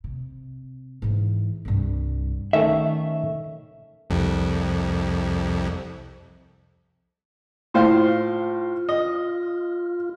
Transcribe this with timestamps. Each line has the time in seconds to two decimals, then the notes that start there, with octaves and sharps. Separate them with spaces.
0.04 C3
1.02 G#2 E3
1.65 C2 G2
2.53 D#3 A3 C#4 E5
4.10 C2 F2
7.74 A2 F4 C5 F5
8.89 D#5